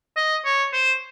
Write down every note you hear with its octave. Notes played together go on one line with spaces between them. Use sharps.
D#5
C#5
C5